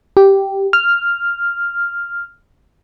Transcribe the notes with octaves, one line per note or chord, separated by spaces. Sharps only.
G4
F6